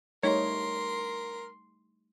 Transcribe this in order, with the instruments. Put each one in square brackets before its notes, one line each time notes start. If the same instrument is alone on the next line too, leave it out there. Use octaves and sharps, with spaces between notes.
[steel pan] G3 A3 D#4 [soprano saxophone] A#4 [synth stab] C#5 [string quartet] C6